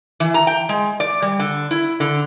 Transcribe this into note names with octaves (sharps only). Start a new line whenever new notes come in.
E3
A#5
G5
G#3
D5
G3
D3
E4
D3